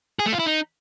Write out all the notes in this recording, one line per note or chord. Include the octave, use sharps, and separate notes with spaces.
G#4
A3
F4
E4
D#4